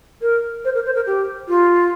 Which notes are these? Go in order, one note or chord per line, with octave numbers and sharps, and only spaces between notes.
A#4
C5
A#4
C5
A#4
G4
F4